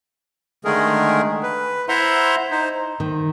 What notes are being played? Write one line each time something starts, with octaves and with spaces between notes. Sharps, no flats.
D3 D#3 G#3 A3 G#4 A#4
B4
E4 C5 E5 F#5 A#5 C6
D#4 C5
D#3